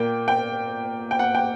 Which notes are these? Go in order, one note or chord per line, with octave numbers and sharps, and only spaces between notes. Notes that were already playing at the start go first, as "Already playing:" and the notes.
Already playing: A#2 A#3 G5
G5
G5
F#5
G5